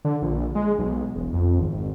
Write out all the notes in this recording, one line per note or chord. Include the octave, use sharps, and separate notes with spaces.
D3
A#1
G#3
B1
E1
F2
G#1